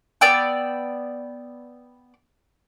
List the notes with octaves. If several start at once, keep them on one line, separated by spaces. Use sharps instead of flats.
B3 D5 G5 E6